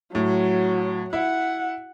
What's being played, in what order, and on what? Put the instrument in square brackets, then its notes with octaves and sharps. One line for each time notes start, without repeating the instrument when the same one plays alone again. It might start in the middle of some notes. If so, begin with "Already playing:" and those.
[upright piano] A2 [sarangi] F#3
[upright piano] E4 [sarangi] F#5